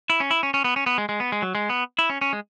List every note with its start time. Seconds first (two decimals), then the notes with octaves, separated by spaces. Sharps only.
0.10 E4
0.20 C#4
0.31 E4
0.43 C#4
0.54 C#4
0.64 B3
0.76 C#4
0.86 B3
0.98 G#3
1.09 G#3
1.20 B3
1.32 G#3
1.42 F#3
1.55 G#3
1.70 B3
1.99 E4
2.10 C#4
2.21 C#4
2.33 G#3